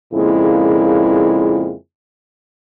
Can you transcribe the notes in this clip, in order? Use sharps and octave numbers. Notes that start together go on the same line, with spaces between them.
F2 A#2 C#3 G#3 A#3 E4